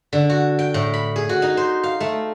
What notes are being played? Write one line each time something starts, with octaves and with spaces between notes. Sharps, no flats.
D3
F#4
G5
A2
B5
G#4
F#4
D#4
C5
F5
A3